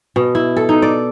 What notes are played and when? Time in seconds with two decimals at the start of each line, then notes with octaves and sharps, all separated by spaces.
0.16 B2
0.35 E4
0.56 A4
0.69 D#4
0.82 D5